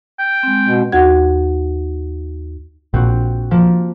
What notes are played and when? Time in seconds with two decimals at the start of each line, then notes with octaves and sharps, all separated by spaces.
0.19 G5
0.43 G#3 C4
0.69 B2
0.92 D#2 F#4 F#5 G#6
2.94 A#1 C4 F#4
3.51 F3 A#3